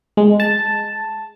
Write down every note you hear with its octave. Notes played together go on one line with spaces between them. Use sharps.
G#3
A5